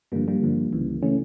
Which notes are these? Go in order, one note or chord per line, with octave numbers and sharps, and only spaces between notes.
G2 D3 F3 G3 A#3
G3 A#3
G2 D3 F3
C#2 C#3 E3
C#3 E3 A3 C#4